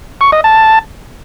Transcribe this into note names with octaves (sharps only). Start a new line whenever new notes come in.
C#6
D#5
A5